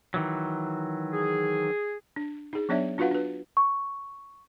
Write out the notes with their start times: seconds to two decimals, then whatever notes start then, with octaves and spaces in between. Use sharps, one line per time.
0.14 D#3 E3 F#3
1.13 G#4
2.16 D4
2.53 D#4 G#4
2.69 F#3 B3 D4 C#5 D5 E5
2.98 D4 F4 F#4 B4 F5 F#5
3.11 D4 B4
3.57 C#6